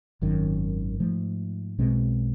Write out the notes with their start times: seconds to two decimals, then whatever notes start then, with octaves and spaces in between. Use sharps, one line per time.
0.22 G#1 F#2 D#3
1.00 G#2 F3 A3
1.78 B1 B2 G#3 C4